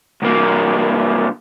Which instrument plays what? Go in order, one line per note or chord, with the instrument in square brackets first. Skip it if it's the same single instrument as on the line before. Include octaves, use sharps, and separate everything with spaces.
[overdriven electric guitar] C2 A#3